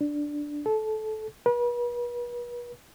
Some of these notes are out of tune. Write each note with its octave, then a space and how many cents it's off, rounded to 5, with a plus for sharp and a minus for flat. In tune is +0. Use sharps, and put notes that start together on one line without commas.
D4 +0
A4 -20
B4 -40